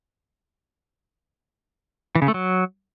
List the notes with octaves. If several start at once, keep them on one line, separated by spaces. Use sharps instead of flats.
E3
C#3
A3
F#3